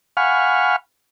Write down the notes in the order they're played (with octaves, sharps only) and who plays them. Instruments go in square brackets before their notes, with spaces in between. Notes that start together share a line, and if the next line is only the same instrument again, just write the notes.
[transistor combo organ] F5 F#5 G#5 B5 C#6 F6